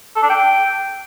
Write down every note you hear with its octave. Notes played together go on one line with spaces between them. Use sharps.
A4
D4
G5